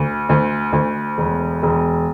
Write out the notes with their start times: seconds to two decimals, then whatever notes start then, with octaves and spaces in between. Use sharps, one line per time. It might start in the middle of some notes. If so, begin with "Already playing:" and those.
Already playing: D2
0.29 D2
0.73 D2
1.18 E1
1.63 E1